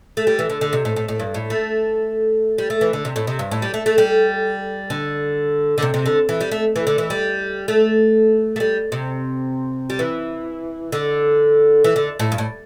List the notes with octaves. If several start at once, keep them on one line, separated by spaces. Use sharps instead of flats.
A3
G3
E3
D3
D3
C3
A2
A2
A2
G2
A2
A3
G3
A3
E3
D3
C3
A2
C3
G2
A2
G3
A3
A3
G3
D3
D3
C3
C3
D3
E3
G3
A3
E3
D3
E3
G3
A3
A3
G3
C3
G3
E3
D3
E3
D3
A2
G2
A2